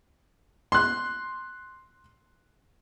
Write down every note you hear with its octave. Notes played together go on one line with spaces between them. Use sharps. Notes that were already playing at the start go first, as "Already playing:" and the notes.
C6 F#6